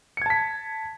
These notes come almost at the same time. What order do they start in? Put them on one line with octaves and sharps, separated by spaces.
C#7 G#6 A5 B6